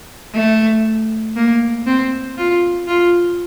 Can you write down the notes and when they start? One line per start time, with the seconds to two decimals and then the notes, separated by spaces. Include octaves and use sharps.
0.34 A3
1.36 A#3
1.86 C4
2.37 F4
2.87 F4